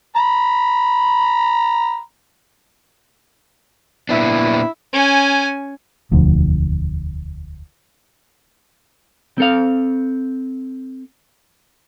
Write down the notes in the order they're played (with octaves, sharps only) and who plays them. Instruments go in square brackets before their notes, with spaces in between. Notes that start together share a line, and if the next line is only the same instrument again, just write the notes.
[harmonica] A#5 B5
[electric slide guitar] A#2 B3 D4 [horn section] E4
[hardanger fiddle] C#4 G#5
[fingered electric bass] E1 D2 F3
[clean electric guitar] C4 A4 F5